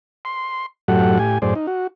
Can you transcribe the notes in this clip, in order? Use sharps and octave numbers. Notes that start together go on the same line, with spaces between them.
C6
F#2 A2 F#3 G4 A4 F#5
A2 G4 G#5
F#2 A2 G#4 C5 D5
D#4
F#4